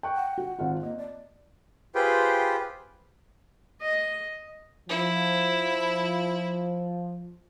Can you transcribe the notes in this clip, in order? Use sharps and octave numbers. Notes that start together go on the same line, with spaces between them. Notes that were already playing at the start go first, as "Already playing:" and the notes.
G5 C#6 F#6
F#5
F#4
G#1 F4
A#3 D#5
D5
F4 G4 G#4 B4 C5 G5
D#5
F3 E4